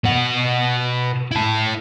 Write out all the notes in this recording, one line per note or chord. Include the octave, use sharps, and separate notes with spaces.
B2 F#5
E4 A5